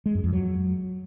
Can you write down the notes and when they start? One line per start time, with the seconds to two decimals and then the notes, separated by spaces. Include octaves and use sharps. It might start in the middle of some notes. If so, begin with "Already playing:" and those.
0.06 G#3
0.15 F#2
0.24 F2
0.33 F#3